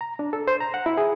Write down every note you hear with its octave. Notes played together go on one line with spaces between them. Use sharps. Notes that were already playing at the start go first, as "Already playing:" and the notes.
A#5
D4
A4
C5
A#5
F#5
E4
G#4